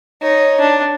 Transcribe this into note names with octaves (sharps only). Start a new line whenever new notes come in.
D#4 C#5
D4